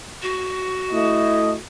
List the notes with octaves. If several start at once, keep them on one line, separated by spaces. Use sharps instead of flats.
F#4
A3 E4 D#5